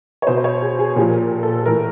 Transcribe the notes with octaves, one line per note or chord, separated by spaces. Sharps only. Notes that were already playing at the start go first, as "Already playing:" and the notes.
C#5
B2 C5
C5
C#5
G#4
G#4
A#2 F3 G4
A4
A2 E3 A#4